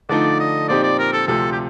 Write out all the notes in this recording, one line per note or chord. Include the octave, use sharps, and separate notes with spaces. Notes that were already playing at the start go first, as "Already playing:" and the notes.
D3 F3 A3 D#4 D5
D#5
A#2 F3 C4 D#4 G4 D5
D5
A#4
A4
D2 C3 F3 A4
G4